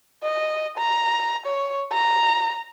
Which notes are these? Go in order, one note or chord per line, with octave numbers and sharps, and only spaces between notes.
D#5
A#5
C#5
A#5